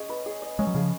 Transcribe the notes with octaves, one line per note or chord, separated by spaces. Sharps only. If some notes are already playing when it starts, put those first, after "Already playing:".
Already playing: C#4 G#4 D#5
B4
G#4
D#5
G#3 C#4
F#3
C#3 F3 G#4